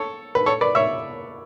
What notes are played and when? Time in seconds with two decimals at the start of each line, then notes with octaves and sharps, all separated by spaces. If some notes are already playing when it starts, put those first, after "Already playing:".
Already playing: A4 C#5
0.35 B4
0.46 A4 C#5
0.61 B4 D5
0.75 C#5 E5